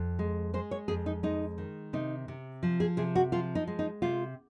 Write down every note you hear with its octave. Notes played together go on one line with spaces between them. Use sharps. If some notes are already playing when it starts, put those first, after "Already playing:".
Already playing: F2
G#3
G#3 C5
C#5
F2 G#4
D#4
G#3 D#4
D#3
C3 D#4
C3
F3
G#4
C3 G#4
F#4
F3 F4
D#4
G#3
D#4
C3 F4